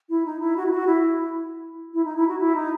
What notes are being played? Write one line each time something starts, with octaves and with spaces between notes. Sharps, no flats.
E4
D#4
E4
F#4
E4
F#4
E4
E4
D#4
E4
F#4
E4
D#4